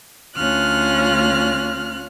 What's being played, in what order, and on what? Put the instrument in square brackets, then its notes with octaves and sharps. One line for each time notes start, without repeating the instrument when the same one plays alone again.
[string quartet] D2 C#4 F4 F6 F#6